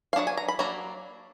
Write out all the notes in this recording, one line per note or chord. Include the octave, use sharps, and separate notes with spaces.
F5
F#3 B3 D4 F#5
G#5
A#5
B5
F#3 A#3 D4 A#5